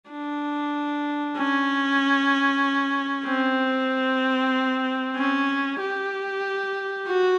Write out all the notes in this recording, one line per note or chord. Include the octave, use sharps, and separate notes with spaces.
D4
C#4
C4
C#4
G4
F#4